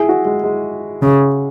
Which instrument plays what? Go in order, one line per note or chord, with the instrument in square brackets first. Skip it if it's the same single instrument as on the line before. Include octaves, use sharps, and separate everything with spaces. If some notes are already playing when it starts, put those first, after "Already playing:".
Already playing: [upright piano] E4 G#4
F#4
G#3
G#3
[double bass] C#3